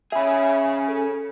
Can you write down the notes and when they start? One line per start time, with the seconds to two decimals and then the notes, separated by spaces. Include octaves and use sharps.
0.12 C#4 G#4 E5 B5
0.88 A4